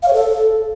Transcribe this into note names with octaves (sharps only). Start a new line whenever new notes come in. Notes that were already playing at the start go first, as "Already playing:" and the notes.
F5
C#5
A4